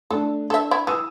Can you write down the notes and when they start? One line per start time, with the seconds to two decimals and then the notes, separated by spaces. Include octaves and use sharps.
0.11 A3 D4 A4
0.50 D4 A4 E5
0.71 E4
0.87 E3 D#6 E6